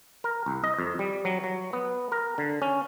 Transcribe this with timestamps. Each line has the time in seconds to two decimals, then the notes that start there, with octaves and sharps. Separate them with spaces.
0.24 A#4
0.46 C2
0.64 D#5
0.79 F2
0.99 G3
1.25 F#3
1.44 F#3
1.73 B3
2.12 A#4
2.38 D3
2.62 C#4